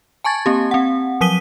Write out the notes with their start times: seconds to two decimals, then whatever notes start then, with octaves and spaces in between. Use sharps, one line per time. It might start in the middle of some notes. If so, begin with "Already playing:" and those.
0.24 G#5 A5 C#6 G#6 A6
0.46 A#3 C4 G4
0.71 C4 F#5
1.21 F3 F#3 D#6 B6 D#7 G7